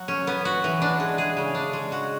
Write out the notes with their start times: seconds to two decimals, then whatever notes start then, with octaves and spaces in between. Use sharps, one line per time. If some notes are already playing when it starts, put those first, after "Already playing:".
Already playing: F#3 F#4
0.08 C#4
0.27 B3
0.45 F#4
0.64 E3
0.82 D4
1.00 G#3
1.18 G#4
1.37 C#3
1.55 D4
1.73 G#3
1.92 F#4